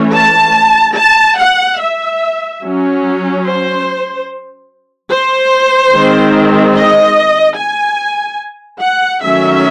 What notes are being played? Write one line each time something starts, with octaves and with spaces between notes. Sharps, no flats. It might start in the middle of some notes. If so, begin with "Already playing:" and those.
Already playing: E3 A3 C#4
A5
A5
F#5
E5
F#3 C#4
C5
C5
D#3 G#3 C4
D#5
G#5
F#5
D#3 F#3 A3 C#4 E5